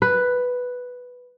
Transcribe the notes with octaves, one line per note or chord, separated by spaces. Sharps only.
B4